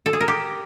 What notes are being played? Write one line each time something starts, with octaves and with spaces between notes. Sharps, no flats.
A4
G#4
A#4
G4